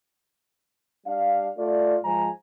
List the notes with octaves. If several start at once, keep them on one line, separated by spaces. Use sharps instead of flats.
G3 D4 F5
A3 F4 D5
G#2 F3 G#3 G#5 A#5